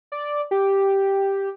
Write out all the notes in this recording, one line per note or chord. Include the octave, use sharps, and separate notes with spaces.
D5
G4